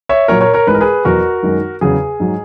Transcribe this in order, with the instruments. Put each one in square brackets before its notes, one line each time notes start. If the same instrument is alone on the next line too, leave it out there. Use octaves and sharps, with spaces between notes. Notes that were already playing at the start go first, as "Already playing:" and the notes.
[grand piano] C#5 E5
A#2 F#3 A#4 C#5
A#4 C#5
A#4 C#5
G#2 E3 G#3 B4
A#4
G#4 B4
E2 B2 F#3 F#4 A#4
F#2 D#3 G#3
E2 C#3 F#3 G#4
G#2 F#3